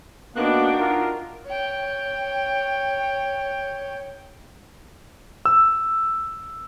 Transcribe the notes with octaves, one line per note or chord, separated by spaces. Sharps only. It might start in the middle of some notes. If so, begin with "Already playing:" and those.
A#3 B3 D4 D#4 F#4 G5 F#6
F4 A#4
C#5 G5
E6